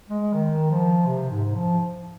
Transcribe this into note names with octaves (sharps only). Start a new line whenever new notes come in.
G#3
D#3
F3
C3
G#2
F3